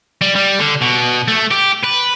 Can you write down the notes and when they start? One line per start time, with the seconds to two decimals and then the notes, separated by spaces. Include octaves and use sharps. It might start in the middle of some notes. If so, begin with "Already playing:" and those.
0.22 G3
0.35 G3
0.59 D3
0.81 B2
1.28 A3
1.51 G4
1.83 B4